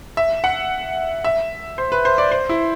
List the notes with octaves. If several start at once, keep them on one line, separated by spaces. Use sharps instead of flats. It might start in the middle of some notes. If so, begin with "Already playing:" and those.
E5
F#5
E5
C5
B4
C5
D5
C5
E4